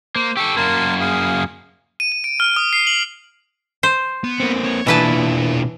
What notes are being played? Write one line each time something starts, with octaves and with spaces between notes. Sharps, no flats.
A#3 C5
G4 A4 C#6 E6
F#2 A#3 A#4 A5 C6
G#4 F5 D#6
D#7
D#7
D7
F6
D#6
C7
F#7
C5
B3
A#3 C4
C#5
B2 E3 A#3 D4 E4 F4 B4 A5